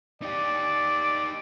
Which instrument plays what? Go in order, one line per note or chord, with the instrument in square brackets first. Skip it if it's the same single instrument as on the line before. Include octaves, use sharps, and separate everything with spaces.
[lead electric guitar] D#4 G4 [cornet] D5